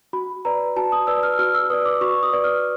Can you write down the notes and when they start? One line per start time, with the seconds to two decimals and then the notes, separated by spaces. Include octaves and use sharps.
0.13 F#4 B5
0.45 B4 D5 A#5
0.76 F#4 A5
0.92 D#6
1.07 B4 D5 E6
1.23 F6
1.39 F#4 F6
1.55 E6
1.70 B4 D5 D#6
1.86 D6
2.01 F#4 C#6
2.23 D#6
2.33 B4 D5
2.44 F6